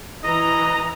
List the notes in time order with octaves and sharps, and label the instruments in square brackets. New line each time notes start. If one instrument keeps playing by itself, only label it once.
[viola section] E3 A#5 [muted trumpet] D#5